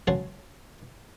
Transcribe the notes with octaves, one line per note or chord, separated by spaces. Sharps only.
C#2 F#3 C#5 F#5 A5 C6